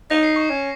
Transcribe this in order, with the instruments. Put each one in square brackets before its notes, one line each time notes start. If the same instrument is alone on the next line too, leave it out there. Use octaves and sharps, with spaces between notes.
[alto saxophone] D#4 [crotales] A#6
[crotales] C7
C#6
[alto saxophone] C#4